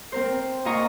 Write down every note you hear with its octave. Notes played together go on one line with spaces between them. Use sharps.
C4 A#4 C5
A#2 F4 D#5 A#5 C#6